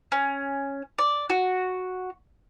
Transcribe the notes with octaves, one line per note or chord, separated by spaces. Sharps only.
C#4
D5
F#4